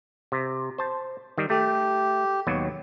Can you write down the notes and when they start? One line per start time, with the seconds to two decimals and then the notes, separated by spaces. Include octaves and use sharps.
0.32 C3
0.78 C5 A5
1.38 D#3 G3
1.50 A3 G4
2.47 D#2 B2 F#3